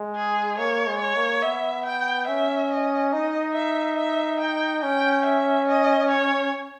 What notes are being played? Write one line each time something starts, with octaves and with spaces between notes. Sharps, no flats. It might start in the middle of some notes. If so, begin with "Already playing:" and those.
Already playing: G#3
G#4
A#3 C#5
G#3
C#5
A#3
B3 E5
G5
C#4 E5
D#5
D#4 D#5
E5
E5
G5
C#4 G5
E5
D#5
C#5